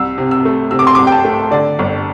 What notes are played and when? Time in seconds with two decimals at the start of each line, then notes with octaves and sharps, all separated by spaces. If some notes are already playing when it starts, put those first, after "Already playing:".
Already playing: C2 E6
0.18 C3
0.31 E6
0.45 A3
0.71 C3 E6
0.79 D6
0.87 C6
0.95 C2 D6
1.07 G5
1.12 A5
1.25 A3
1.51 D3 D5
1.79 G1